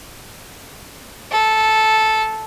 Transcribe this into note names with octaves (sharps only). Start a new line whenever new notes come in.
A4